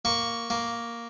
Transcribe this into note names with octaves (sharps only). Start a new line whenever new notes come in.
A#3 C#6
A#3